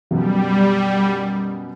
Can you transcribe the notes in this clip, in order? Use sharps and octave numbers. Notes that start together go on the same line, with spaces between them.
F#2 B2 F#3 G3